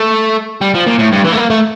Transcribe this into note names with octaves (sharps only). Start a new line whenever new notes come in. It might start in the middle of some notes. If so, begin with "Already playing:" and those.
Already playing: A3
G3
F3
A#2
A2
G2
E3
A3
A#3
A3